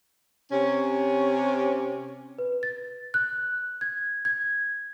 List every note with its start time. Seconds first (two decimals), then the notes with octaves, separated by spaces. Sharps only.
0.50 C3 C#4
2.39 B4
2.63 A6
3.14 F#6
3.81 G#6
4.25 G#6